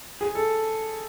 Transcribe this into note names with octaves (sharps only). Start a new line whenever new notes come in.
G#4
A4